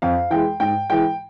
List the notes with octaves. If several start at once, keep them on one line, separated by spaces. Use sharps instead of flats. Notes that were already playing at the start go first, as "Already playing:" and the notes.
F2 F5
E3 G#3 G5
G#2 G5
E3 G#3 G5